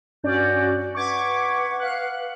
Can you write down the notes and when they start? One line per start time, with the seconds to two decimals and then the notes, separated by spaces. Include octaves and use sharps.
0.24 G2 C#4 F#4 D5 G6
0.95 B4 E5 F#5 C#6 D6 G#6
1.80 F5 F#6